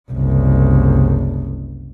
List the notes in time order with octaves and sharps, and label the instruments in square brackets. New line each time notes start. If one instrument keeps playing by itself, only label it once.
[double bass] F#1 C2